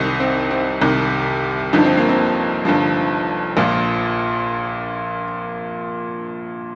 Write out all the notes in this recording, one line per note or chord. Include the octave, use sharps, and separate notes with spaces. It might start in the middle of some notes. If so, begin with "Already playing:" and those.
Already playing: C2 C3 D#3 D#4
C4
C4
C2 C3 D#3
G1 G2 F3 D#4
C4
A#3
C4
G1 G2 F3
A#1 A#2 F3 F4